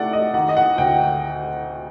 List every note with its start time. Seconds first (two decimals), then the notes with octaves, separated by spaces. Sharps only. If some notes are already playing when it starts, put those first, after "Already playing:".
Already playing: C3 A3 D5 F#5
0.13 D#5
0.34 D#3 F#5
0.49 D#5
0.57 F#5
0.78 D2 G5